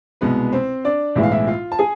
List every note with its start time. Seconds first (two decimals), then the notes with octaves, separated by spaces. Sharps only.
0.21 C2 B2 G#3 B3 B4
0.52 C4 C5
0.84 D4 D5
1.16 B1 A2 E3 G#3 E5
1.23 F5
1.31 E4 E5
1.47 F4 F5
1.72 A5
1.78 G#4 G#5